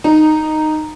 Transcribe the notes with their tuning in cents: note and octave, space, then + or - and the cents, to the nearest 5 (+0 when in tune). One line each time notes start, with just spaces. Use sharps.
D#4 -10